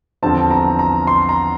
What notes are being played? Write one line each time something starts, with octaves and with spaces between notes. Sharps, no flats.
E2 D3 F3 C4 A5
A#5
A#5
C6
A#5